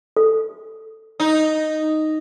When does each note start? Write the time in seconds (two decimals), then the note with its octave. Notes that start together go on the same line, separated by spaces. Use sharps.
0.16 A4
1.20 D#4